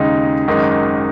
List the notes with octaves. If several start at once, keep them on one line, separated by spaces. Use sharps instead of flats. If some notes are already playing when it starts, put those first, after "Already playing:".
Already playing: D#2 C#3 G#3 D#4
G#1 F#2 D#3 G#3 D#4